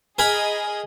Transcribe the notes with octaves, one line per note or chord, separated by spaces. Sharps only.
G#4 A#4 D#5 G#5 B5